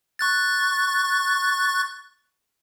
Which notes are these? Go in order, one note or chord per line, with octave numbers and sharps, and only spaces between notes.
C#6 F#6 A6